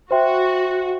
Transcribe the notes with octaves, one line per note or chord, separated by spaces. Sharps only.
F#4 C5 E5 G5 C6